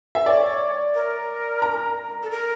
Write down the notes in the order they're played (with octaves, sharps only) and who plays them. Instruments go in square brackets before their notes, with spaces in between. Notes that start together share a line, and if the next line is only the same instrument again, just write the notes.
[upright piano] E5
[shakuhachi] C#5 [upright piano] D5
[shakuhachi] A#4
[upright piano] A#5
[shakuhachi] A4
A#4